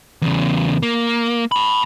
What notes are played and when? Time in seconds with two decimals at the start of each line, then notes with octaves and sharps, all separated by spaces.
0.22 E2 C#3
0.83 A#3
1.52 A5 B5